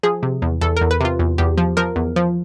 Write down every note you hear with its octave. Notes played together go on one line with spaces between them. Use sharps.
F3 G#4
C3
E2
E2 A4
A#4
E2
B4
C3 F4
E2
E2 G4
F3
F3 A#4
E2
F3